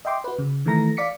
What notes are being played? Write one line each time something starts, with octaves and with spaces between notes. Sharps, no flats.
D#5 E5 G5 C6 D6
F#4 B4
C#3
D#3 E3 A3 A#5 A#6
D5 F5 D6 B6 C#7